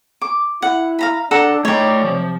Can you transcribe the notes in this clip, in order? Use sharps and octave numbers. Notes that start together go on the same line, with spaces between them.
D6
E4 F#5
F5 A#5 B5
D4 A4 F#5 A#5
A3 D#4 C#5 D5 G5
C3 F3